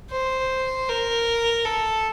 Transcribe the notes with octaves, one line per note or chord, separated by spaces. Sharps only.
C5
A#4
A4